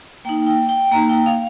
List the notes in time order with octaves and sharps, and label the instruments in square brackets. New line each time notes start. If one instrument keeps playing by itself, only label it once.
[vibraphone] A#3 D#4 G5
G5
G5
A#3 D#4 A#5
G5
F5